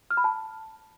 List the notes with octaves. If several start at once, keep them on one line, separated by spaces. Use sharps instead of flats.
F6
B5
A5